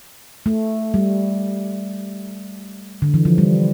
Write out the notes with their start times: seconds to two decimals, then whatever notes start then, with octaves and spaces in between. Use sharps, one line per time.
0.46 A3
0.94 G3
3.02 D3
3.14 E3
3.25 F3
3.38 G3